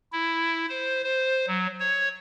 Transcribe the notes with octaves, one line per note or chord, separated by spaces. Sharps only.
E4
C5
C5
F#3
C#5